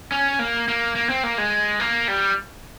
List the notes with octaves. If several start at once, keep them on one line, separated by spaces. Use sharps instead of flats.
C#4
A#3
A#3
A#3
C4
A#3
G#3
A#3
G3